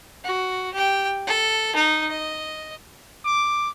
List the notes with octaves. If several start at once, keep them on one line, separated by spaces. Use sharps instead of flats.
F#4
G4 G5
A4
D#4
D#5
D6